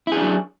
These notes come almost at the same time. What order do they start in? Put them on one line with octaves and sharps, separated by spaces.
E4 G#4 D4 F#3